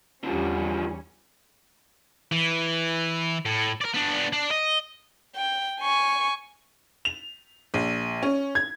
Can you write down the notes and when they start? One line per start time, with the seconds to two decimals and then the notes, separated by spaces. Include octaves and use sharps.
0.24 E2 D3 F3 G3 C#4
2.32 E3
3.46 A2
3.82 A#4 D5
3.94 B3 D4
4.33 D4
4.51 D#5
5.36 G5
5.80 G#5 C#6
7.05 F7
7.74 A#1
8.23 C#4
8.55 G#6